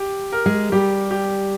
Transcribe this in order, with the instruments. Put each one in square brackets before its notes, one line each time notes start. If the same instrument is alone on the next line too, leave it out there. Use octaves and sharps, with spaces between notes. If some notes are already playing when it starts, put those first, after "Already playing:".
Already playing: [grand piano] G4
A#4
[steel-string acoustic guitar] G#3
[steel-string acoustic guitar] G3 [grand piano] G4
[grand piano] G4